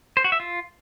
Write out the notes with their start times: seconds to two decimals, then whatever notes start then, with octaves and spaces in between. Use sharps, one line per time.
0.17 C5
0.24 F#4
0.32 E5
0.40 F4